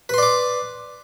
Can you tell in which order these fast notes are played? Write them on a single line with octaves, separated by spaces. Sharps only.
B4 C6 D5 D6